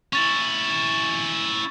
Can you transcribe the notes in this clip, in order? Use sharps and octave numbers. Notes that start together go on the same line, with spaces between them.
C#4 E4 C#6 A6 F#7